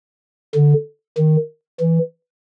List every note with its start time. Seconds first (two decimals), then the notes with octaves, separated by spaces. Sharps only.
0.55 D3
1.18 D#3
1.80 E3